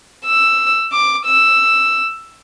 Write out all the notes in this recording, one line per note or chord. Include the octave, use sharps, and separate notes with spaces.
E6
D6
E6